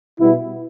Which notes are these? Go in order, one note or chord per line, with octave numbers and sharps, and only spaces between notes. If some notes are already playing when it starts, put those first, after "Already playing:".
B2 G3 B3 E4